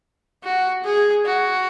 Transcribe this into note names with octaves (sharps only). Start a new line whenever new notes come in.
F#4
G#4
F#4